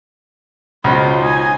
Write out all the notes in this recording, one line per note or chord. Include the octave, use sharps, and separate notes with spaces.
C#2 B2 F4 C5
D#4 G#5